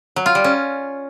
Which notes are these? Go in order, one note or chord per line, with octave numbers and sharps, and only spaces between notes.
F#3
F4
G3
C#4